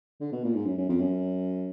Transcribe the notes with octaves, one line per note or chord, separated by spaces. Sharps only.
D3
B2
A#2
G#2
F#2
F#2
F2
F#2